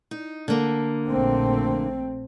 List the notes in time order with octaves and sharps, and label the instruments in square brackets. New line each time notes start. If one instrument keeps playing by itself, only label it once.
[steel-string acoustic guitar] D#4
D3 A#3
[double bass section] A#1 A3 C4